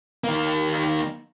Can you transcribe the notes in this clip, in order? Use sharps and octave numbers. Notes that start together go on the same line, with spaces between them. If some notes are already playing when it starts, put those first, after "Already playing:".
D#3 A#3